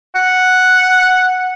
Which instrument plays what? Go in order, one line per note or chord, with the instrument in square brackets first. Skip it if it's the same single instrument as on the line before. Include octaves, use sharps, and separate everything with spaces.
[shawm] F#5